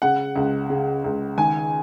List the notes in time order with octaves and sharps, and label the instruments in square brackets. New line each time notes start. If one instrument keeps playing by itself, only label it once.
[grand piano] C#3 F#5
C#2
C#3
C#2
D#3 G#5